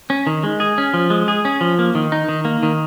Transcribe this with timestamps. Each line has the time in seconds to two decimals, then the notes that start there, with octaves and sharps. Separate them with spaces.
0.10 C#4
0.27 D#3
0.43 G#3
0.60 G#4
0.78 C#4
0.94 F3
1.10 G#3
1.28 G#4
1.45 C#4
1.61 F3
1.79 A#3
1.95 D#3
2.12 D#4
2.29 D#3
2.45 A#3
2.63 D#3